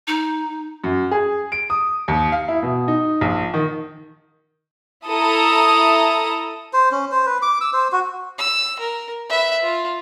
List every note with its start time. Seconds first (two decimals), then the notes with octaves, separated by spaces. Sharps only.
0.07 D#4
0.84 F#2
1.11 G#4
1.52 D7
1.70 D#6
2.08 D#2
2.32 F5
2.48 E4
2.63 B2
2.88 D#4
3.21 A#1
3.54 D#3
5.06 E4 A4 A#5 D#6
6.73 C5
6.92 C#4
7.12 C5
7.26 B4
7.42 D6
7.61 E6
7.73 C5
7.92 F#4
8.38 E6
8.79 A#4
9.29 B4 E5
9.62 F4